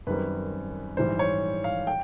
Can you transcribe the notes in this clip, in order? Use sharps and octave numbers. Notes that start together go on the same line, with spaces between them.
F#2 D#3 G3 C4 B4
A#1 G#2 E3 G3 C5
C#5
F5
G5